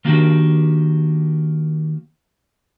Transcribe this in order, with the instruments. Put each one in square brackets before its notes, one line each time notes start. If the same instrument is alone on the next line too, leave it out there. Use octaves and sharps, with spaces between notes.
[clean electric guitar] D#3 A#3 D4 F#4 G4